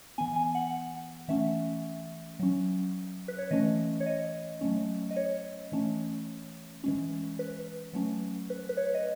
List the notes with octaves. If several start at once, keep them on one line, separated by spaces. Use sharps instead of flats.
E3 B3 G#5
G#5
F#5
E3 A3 C#4 E5
F#3 C#4
B4
C#5
E3 A3 C#4 D#5
C#5
D#5
F#3 A3 C#4
D#5
C#5
E3 A3 C#4
E3 G#3 C#4
B4
F#3 A3 C#4
B4
B4
C#5
D#5